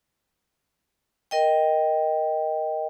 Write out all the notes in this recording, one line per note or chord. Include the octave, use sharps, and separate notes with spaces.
A#4 D#5 G5